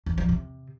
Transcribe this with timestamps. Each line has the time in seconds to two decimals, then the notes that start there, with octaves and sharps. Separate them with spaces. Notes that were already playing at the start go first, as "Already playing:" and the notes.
0.06 E2
0.18 F3
0.29 C3